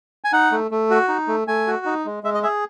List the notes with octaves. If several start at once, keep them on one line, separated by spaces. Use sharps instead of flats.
G#5
D#4 F#5
A3
A3
F#4
D#4
A3
A3 G#5
F#4
D#4
G#3
G#3 E5
D#5
G#4 E5